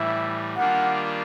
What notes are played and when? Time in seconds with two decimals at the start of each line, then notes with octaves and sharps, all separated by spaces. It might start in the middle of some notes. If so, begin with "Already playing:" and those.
Already playing: A2 E3 G3 E5
0.57 D#3 G3 A#3 D4 F4 F#5